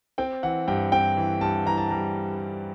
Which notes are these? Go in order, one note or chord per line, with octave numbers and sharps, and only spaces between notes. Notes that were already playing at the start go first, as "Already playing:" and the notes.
C4 G5
E3 F#5
G2 G5
C4 G5
E3
G2 A5
E3 A#5
A5
G3 A#5